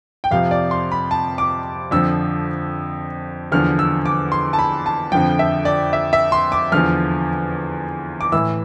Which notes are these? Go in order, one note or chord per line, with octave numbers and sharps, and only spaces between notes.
G5
F2 C3 F3 F5
D5
C6
B5
A5
D6
F2 D3 F3 E6
E2 D3 F3 F6
E6
D6
C6
A5
B5
A5
F2 D3 F3 G5
E5
D5
E5
E5
C6
D6
E2 D3 F3 F6
D6
A2 E3 E6